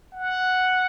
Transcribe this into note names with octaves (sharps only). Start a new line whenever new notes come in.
F#5